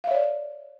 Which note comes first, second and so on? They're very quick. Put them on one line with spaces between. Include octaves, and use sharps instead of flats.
F5 E5 C#5 D5